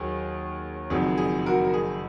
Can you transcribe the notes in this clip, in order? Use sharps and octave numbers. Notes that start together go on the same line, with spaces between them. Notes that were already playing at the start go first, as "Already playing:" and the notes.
Already playing: D#2 D#3 F#3 G#4
F#1 F2 D#3 F#3 G#4
G#4
F#4 A#4
A#4
G#4